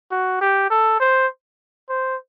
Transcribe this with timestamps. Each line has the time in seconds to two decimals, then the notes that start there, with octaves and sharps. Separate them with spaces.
0.11 F#4
0.41 G4
0.70 A4
1.00 C5
1.89 C5